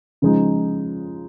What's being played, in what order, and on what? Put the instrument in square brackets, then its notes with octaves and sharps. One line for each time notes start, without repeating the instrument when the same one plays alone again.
[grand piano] C#3 F3 G#3 D#4